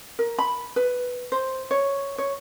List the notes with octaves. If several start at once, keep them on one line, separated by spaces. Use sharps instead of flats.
A#4
B5
B4
C5
C#5
C#5